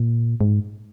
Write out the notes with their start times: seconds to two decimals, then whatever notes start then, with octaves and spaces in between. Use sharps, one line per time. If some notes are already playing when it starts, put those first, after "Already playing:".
Already playing: A#2
0.41 G#2